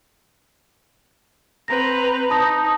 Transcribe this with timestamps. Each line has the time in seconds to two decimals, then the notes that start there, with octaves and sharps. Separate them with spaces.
1.68 C4 B4 A#5 A#6
2.30 D#4 A5 D#6 A#6